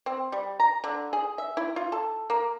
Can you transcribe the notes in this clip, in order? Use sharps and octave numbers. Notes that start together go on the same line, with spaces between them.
C4
G3
A#5
D3
G#4
E5
E4
F4
A4
A#3